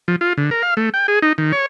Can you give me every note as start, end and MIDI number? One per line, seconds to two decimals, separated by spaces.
0.08 0.16 53
0.21 0.33 65
0.37 0.50 50
0.51 0.62 70
0.62 0.74 77
0.77 0.90 57
0.94 1.07 79
1.08 1.19 68
1.22 1.33 63
1.38 1.52 51
1.52 1.66 73